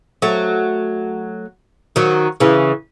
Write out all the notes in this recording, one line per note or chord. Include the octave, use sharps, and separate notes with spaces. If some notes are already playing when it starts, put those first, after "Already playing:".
F#3 A3
D#3 F#3
C#3 E3